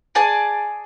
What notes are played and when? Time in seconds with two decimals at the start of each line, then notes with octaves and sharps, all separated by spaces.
0.15 G#4 D5 G#5 A5